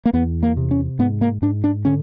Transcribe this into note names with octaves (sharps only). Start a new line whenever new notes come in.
A#3
E2 B3
A#3
C3
C#4
G#2 B3
A#3
G#2 D4
D4
D3 C#4